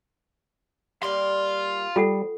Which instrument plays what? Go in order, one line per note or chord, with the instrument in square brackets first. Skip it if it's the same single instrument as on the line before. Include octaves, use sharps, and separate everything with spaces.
[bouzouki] G3 A#3 D5 [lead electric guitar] F5 C6
[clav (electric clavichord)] G3 [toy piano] F4 A4 F#5